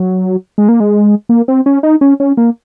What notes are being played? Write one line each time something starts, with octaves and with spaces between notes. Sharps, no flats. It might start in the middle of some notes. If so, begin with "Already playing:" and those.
Already playing: F#3
G#3
A#3
G#3
A#3
C4
C#4
D#4
C#4
C#4
A#3